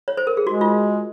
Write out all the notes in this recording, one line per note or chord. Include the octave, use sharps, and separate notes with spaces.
C#5
C5
A#4
G#4
G#3 F#4
F4